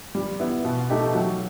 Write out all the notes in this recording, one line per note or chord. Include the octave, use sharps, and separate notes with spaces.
G3
B3 E4
B2
A3 D#4 G4
F#3